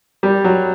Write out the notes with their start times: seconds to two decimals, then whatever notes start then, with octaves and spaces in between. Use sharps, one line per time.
0.23 G3
0.44 F#3